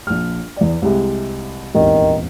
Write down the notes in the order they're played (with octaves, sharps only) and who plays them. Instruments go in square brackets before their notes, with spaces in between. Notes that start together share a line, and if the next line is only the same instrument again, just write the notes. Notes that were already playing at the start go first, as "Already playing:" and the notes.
[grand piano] A#1 F6
E2 D5
C2 C3 G#3
[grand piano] D#1 G#1 E2 [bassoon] D#3